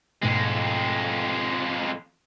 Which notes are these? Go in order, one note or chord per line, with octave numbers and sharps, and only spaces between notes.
F2 G#2 B2 G#3 A3